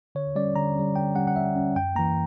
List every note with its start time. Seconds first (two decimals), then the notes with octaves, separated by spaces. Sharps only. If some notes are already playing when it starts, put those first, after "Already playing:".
0.15 D3 C#5
0.36 G3 C#4 D5
0.56 D3 A#5
0.75 G3 C#4
0.96 D3 G5
1.16 G3 C#4 F#5
1.28 F#5
1.36 D3 E5
1.56 G3 C#4
1.76 F#2 G5
1.95 E3 A#3 A#5